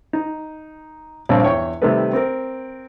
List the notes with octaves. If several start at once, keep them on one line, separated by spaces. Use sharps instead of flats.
D#4
A#1 G2 A#2 C4 C#5
E2 C#5 G5 C#6
C3 D#3 G3 A3 A4 B4
C4 A#4